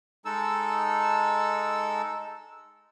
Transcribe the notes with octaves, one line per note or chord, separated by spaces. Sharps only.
G#3 D#4 A4 E6